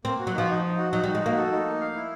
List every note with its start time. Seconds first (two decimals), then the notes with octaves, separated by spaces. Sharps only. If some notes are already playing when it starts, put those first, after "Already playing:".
0.05 A#3 C4
0.19 F#4
0.27 F#3
0.34 F3 D#4
0.49 D#4
0.64 D#4
0.77 F#4
0.92 F#3 D#4
1.03 G3
1.07 D#4
1.15 G#3
1.21 A#3 F#4
1.37 A4
1.51 D#4
1.66 A#3
1.81 F5
1.95 E4